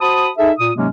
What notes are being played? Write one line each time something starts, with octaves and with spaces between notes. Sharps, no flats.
F#4 C5 A5 B5 D#6
D#4 G#4 A4 E5
A#2 D#6
G#2 C3 F#3 G#3 A#3 C#4